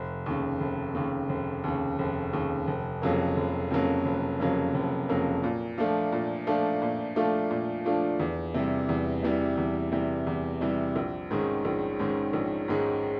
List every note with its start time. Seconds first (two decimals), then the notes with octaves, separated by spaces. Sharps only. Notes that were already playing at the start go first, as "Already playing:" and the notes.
Already playing: F1
0.26 D#2 C#3
0.60 F1
0.95 D#2 C#3
1.29 F1
1.64 D#2 C#3
1.99 F1
2.33 D#2 C#3
2.67 F1
3.02 F2 C#3 F#3 A#3
3.36 F1
3.71 F2 C#3 F#3 A#3
4.05 F1
4.40 F2 C#3 F#3 A#3
4.74 F1
5.09 F2 C#3 F#3 A#3
5.44 A#2
5.78 F3 A3 D4 F4
6.12 A#2
6.47 F3 A3 D4 F4
6.82 A#2
7.16 F3 A3 D4 F4
7.51 A#2
7.85 F3 A3 D4 F4
8.20 E2
8.54 C3 E3 G3
8.89 E2
9.23 C3 E3 G3
9.58 E2
9.92 C3 E3 G3
10.27 E2
10.61 C3 E3 G3
10.96 A#1
11.30 G#2 D#3 G#3 C#4
11.65 A#1
11.99 G#2 D#3 G#3 C#4
12.33 A#1
12.68 G#2 D#3 G#3 C#4